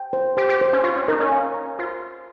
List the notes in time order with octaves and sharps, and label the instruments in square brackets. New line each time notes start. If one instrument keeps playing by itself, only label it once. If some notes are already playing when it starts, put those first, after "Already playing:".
Already playing: [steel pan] G5
C5
[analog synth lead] G4 [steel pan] C5
[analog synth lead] G4
[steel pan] C5
[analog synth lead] C#4
[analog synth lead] F4 [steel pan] C#6
[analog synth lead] C#4
[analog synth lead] D#4 [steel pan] A#4
[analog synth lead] C#4
[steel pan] F5
A#5
[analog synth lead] F4 [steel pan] C5